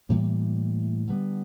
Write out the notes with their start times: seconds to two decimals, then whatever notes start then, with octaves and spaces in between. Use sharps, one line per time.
0.09 A2 E3 G3 A#3
1.07 D3 G3 B3